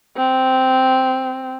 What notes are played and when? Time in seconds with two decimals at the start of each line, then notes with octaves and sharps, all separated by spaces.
0.17 C4